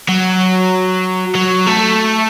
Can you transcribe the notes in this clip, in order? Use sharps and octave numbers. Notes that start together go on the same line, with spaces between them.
F#3
F#3
A3